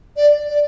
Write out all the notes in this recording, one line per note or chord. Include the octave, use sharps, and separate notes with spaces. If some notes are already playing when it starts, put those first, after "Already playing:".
D5
D5